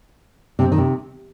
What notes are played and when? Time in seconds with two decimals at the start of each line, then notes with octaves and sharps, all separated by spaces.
0.59 C3
0.65 C4
0.72 D#3
0.78 C3